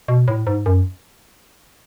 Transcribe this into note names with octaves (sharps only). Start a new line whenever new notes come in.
B2
A2
G#2
F#2